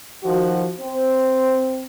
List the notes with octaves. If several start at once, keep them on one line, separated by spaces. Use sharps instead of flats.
D#3 F3 F#4
C4